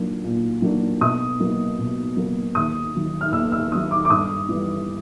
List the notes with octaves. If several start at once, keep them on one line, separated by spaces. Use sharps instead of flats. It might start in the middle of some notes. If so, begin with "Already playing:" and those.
Already playing: A#2 F#3 A#3 D4
A#2
F#3 A#3 D4
B2 D#6
F#3 A#3
B2
F#3 A#3
D#2 D#6
D#3 F#3
F6
D#2 E6
E6
D#3 F#3 D#6
D6
D6
G2 D#6
E3 G3 B3